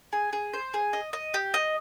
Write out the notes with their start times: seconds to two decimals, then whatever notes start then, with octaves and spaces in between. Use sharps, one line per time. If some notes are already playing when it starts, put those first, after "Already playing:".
0.13 G#4
0.33 G#4
0.53 C5
0.74 G#4
0.93 D#5
1.13 D#5
1.34 G4
1.54 D#5